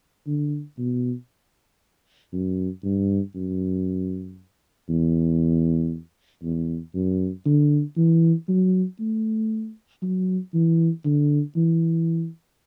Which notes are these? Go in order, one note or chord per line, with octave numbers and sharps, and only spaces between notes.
D3
B2
F#2
G2
F#2
E2
E2
F#2
D3
E3
F#3
A3
F#3
E3
D3
E3